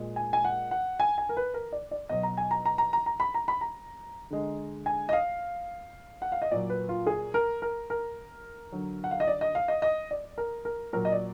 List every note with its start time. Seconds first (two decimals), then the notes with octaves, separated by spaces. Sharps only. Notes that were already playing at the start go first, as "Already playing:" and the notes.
Already playing: A#2 G#3
0.16 G#5
0.33 G#5
0.44 F#5
0.71 F#5
1.00 G#5
1.18 G#5
1.29 A#4
1.37 B4
1.54 A#4
1.72 D5
1.91 D5
2.09 B2 F#3 D#5
2.23 A#5
2.37 G#5
2.51 A#5
2.65 A#5
2.78 A#5
2.93 A#5
3.06 A#5
3.20 B5
3.34 A#5
3.48 B5
3.61 A#5
4.30 D3 G#3
4.86 G#5
5.09 D#5
5.13 F5
6.22 F#5
6.32 F5
6.42 D#5
6.51 A#2 F#3 D5
6.70 B4
6.89 F4
7.07 G#4
7.34 A#4
7.62 A#4
7.90 A#4
8.72 D3 F#3
9.04 F#5
9.11 F5
9.20 D#5
9.27 D5
9.41 D#5
9.55 F5
9.68 D#5
9.82 D#5
10.11 D5
10.38 A#4
10.65 A#4
10.93 A#2 F#3 A#4
11.05 D#5
11.12 D5